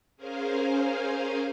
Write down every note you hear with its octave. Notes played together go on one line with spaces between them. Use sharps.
C#4 G#4 A#4 C5 F5 G#5